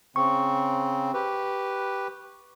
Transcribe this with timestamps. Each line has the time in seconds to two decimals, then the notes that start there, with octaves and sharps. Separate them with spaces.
0.16 C#3 C4 C#6
1.13 G4 B4